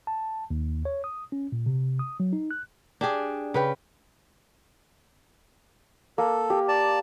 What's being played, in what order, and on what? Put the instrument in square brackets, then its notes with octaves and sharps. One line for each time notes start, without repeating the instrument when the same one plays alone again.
[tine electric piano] A5
D#2
C#5
D#6
C#4
A#2
C3
D#6
F#3
D#4
F#6
[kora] D4 G4 G#4
C#3 B4 G5
[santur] A#3 [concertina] A4
[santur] G4
[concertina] D5 A5